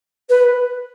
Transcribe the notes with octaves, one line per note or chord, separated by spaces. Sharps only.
B4